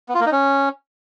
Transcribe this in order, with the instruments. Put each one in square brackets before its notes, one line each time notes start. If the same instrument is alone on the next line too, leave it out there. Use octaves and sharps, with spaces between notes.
[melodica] B3
F4
A#3
D#4
C#4